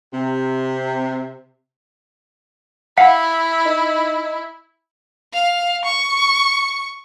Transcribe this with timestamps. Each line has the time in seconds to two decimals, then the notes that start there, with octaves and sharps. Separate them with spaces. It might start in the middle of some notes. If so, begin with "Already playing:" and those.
0.12 C3
2.97 E4 F5 F#5 B6
3.66 D#4
5.33 F5
5.85 C#6